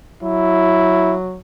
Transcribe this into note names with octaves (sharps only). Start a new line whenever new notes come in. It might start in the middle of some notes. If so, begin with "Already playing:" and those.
F#3 E4